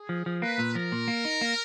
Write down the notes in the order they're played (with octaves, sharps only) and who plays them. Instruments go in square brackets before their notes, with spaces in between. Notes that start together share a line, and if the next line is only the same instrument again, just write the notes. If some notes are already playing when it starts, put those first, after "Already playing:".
Already playing: [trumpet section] G#4
[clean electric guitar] F3
F3
[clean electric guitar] A#3 [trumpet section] B4
[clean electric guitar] A#2
[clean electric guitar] F3 [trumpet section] A#4
[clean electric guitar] A#2
A#3
D#4
A#3